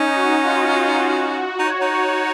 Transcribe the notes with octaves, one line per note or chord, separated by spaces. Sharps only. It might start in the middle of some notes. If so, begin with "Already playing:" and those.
Already playing: C#4 D#4
F#4
F4
F#4
D#4 C#5
D#4